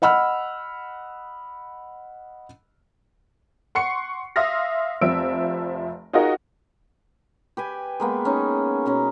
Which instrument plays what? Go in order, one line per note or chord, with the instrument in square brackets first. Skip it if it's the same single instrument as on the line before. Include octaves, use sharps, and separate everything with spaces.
[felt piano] D#5 F#5 B5 E6 F6
[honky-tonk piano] F#5 C6 C#6 C7 C#7
E5 F5 C6 D#6 F6 A#6
F1 F3 C4 E5 E6 D7
D#4 F4 F#4 G#4 A#4 D#5
[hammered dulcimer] G4 B4 G#5
G#3 A#3 B3
C#4 D#4
B2 C#4 A#5